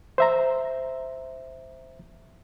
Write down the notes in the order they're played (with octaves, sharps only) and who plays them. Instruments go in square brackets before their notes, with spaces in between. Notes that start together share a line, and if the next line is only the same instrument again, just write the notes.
[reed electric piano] C5 E5 A#5